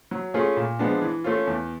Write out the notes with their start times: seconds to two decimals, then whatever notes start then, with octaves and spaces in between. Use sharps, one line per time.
0.11 F#3
0.34 A3 C#4 F4 G#4
0.57 A#2
0.79 F3 G#3 B3 D4
1.02 E3
1.24 A3 C#4 F4
1.47 E2